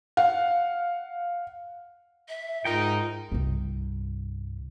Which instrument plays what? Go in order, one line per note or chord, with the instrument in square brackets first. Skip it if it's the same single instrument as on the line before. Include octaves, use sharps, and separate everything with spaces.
[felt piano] F5 F#5
[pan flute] E5
[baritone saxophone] G#2 [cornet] D#4 [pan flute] F4 [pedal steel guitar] A#4 G5
[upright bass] C2 G2